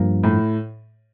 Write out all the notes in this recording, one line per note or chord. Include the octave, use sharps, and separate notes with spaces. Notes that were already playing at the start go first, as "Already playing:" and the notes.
Already playing: G2 F3 A#3
A2